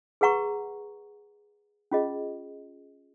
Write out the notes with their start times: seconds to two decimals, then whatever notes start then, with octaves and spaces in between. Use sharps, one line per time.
0.21 G#4 B4 F#5 A#5 C#6
1.91 C#4 F4 G#4 D#5